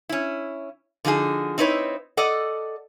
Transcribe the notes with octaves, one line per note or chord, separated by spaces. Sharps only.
C#4 E4
D3 F3 D#4 F#4 G#4
C4 D#4 E4 B4 C#5
A4 D5 D#5 F#5